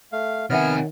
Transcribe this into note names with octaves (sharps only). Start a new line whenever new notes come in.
A3 F5
C3 D#3 B3 C#5 E5 F#5 G#5 F6